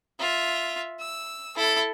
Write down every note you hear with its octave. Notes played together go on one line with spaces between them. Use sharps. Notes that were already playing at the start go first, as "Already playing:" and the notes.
F4 E5
E6
E4 A4